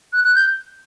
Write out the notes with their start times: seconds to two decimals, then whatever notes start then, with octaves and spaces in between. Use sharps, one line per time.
0.13 F#6
0.24 F#6
0.35 G6